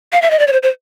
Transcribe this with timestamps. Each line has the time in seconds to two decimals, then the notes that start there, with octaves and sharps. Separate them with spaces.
0.12 F5
0.22 E5
0.30 D#5
0.39 D5
0.47 C#5
0.53 C5
0.63 C5